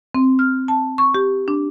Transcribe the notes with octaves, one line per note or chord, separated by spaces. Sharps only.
C4
F6
A5
C#6
G4
D4